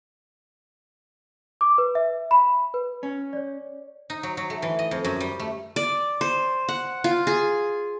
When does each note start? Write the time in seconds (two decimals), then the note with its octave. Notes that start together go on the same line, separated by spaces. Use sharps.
1.61 D6
1.78 B4
1.95 E5
2.31 B5
2.74 B4
3.03 C#4
3.33 C#5 D5
4.10 D#4
4.23 F#3
4.37 F#3
4.50 A3
4.62 E3
4.79 D#5
4.91 F2
5.04 F#2
5.20 G3
5.40 A3
5.76 D5
6.21 C5
6.68 F#5
7.04 F4
7.27 G#4